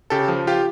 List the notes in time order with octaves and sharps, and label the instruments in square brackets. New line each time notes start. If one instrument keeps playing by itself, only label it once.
[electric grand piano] C#3 G4 A4
F3
F4 G4